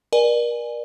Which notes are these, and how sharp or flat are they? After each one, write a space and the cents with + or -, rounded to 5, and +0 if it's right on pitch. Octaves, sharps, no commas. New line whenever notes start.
A#4 +35 D5 +25 G#5 +0